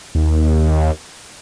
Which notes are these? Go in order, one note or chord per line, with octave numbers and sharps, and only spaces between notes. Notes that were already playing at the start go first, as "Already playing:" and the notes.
D#2